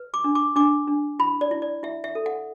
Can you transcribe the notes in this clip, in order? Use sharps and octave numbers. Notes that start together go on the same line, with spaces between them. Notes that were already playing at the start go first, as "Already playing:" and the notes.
Already playing: B4
D6
D4
D6
D4 D6
D4
E4 B5
D5
E4
D5
E4 E5
E5
A4
F#5